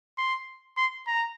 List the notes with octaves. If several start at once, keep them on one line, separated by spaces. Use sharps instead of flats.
C6
C6
A#5